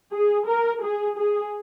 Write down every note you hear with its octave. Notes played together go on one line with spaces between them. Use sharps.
G#4
A#4
G#4
G#4